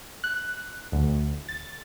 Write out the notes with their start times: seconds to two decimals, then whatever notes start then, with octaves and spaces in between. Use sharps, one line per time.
0.24 F#6
0.92 D2
1.49 A6